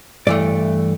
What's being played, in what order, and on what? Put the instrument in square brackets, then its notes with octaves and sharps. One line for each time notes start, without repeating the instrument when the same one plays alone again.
[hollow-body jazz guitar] G2 E3 A3 D5